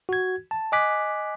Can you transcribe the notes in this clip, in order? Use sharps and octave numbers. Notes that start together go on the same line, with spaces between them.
F#4 G#6
A5
D#5 G#5 D6 F#6 B6